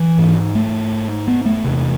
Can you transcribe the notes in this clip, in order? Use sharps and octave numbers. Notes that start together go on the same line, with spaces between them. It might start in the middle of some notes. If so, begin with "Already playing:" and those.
Already playing: E3
G#2
A3
B3
A3
E2 C3